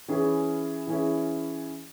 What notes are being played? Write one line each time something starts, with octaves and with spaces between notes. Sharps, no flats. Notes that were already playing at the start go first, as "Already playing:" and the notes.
E3 C#4 E4 G#4
E3 C#4 E4 G#4